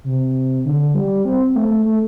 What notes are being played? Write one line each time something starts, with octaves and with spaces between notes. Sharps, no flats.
C3
D3
G3
C4
C4
A3
A3